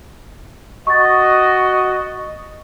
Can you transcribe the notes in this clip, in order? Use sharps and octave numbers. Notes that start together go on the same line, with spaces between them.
F#4 D#5 C#6 A6